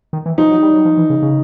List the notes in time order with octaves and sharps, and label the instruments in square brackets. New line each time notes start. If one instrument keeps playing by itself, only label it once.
[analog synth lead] D#3
E3
[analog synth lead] F3 [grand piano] D#4
[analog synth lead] F#3
G3
F#3
F3
E3
C#3
C#3